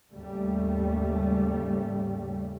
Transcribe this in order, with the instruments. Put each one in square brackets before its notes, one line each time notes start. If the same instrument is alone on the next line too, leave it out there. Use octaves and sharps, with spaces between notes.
[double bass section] D#2 G#2 C#3 G3 A3